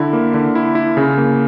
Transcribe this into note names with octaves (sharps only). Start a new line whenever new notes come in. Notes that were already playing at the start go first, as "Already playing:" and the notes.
Already playing: D3 E4
A#3
D3
E4
E4
C#3
A#3